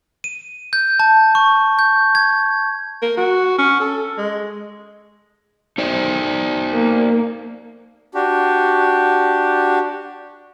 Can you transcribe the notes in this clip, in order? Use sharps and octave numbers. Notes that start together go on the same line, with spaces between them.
D#7
G6
A5
C#6
G6
G#6
A#4
F#4
C#4
A4
G#3
D#4 C5 D5
A#3
D4 F#4 G4